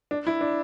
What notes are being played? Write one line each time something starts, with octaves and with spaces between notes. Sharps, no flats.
D4
E4
D4